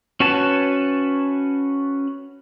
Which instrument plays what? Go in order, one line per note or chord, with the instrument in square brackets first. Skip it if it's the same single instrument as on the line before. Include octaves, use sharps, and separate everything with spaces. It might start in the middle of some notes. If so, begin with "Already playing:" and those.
[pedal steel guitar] C#4 F#4 B4 C#5 A5